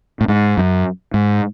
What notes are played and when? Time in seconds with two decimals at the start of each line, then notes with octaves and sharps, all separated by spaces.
0.21 A2
0.28 G#2
0.57 F#2
1.14 G#2